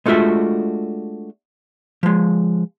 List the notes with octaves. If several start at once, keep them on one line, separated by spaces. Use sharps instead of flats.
G#3 A3 D4 F4 F#4 E5
F3 G#3